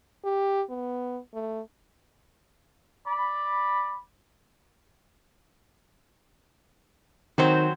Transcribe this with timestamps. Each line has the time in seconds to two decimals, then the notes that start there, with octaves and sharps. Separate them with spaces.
0.24 G4
0.70 B3
1.34 A3
3.07 D5 B5
7.38 D#3 F#3 C4 C5